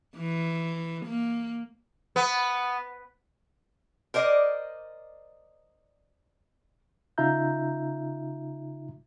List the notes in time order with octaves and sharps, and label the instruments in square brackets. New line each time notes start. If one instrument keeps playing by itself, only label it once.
[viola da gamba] E3
A#3
[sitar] B3
[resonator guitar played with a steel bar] A#4 C5 D5 D#5
[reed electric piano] C#3 D#4 F4 E5 A#5 G6